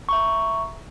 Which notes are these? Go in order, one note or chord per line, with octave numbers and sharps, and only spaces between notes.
E5 A#5 C#6